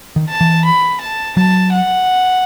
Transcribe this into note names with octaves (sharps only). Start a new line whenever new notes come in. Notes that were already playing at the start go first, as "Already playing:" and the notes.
D#3
A5
E3
B5
A5
F#3 A5
F#5